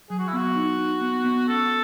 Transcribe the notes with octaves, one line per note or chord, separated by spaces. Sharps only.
F#3 G#4
F#4
E4
B3 F#4
D#4
D#4
B3
B3
C#4 A4